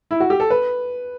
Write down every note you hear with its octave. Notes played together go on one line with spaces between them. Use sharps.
E4
F#4
G4
A4
B4